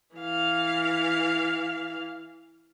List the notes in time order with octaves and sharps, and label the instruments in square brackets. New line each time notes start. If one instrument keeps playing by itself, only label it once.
[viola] E3 F5